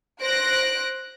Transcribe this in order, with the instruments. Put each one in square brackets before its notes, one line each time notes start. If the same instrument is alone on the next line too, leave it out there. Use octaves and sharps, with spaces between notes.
[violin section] C5 F#6 A#6 D7